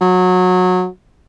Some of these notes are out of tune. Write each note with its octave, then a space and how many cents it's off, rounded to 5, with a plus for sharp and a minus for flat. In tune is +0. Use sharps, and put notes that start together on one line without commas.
F#3 -20